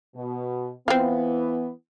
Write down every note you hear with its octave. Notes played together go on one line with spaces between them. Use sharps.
B2
E3 B3 C4 F4